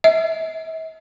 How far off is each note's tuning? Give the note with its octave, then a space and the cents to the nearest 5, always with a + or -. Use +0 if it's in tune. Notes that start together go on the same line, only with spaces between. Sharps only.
E5 -45